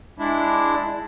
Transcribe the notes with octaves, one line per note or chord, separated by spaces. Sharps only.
G#3 D4 E4